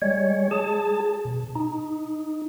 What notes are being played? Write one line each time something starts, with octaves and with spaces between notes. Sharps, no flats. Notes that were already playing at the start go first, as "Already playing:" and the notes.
G3 G#3 C#5
G#4 A5
B2
D#4